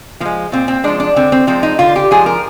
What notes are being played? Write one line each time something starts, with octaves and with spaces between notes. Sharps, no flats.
F3 A#3
G#3
A#2 C4
C4
F3 G#3 D4
D4
D3 C4
C4
F3 G#3 C4
D#4
D3 F4
G4
F3 G#3 G#4
A#4